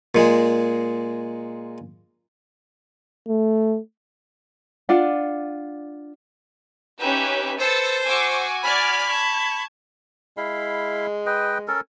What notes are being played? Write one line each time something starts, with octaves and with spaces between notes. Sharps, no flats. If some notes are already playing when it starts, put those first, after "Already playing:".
A#2 G#3
A3
D4 F4 D5 F#5
C#4 D#4 G4 B4 E5
A4 B4 C5 E6 A6 C#7
F#4 G#5 C#6 D6 E6
D5 B5 F6 G#6
A5 C#6 G#6
G#3 E4 F5 B5
B4 D#5 G5
C#4 A4 A#4